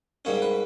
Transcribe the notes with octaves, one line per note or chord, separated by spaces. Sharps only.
G#2 G3 A#3 C#4 C#5
B4